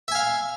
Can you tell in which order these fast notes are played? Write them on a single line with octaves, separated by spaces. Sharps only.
E5 G#5 F5